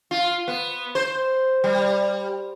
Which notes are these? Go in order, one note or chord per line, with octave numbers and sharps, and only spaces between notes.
F4
B3
C5
G3